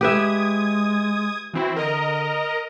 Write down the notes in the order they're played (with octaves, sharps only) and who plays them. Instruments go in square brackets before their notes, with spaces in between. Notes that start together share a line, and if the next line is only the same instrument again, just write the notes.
[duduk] G#3 [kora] G4 B4 E5 [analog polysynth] D#6 G#6
[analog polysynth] E3 C4 E4 [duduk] F#4
[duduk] D3 [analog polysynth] A#4 D#5 A#5